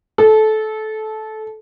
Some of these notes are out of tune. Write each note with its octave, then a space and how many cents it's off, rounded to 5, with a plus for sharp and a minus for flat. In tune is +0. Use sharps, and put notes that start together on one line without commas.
A4 -20